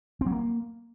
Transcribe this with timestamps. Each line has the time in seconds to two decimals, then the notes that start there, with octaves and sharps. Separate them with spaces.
0.21 C4
0.26 F#3
0.32 A#3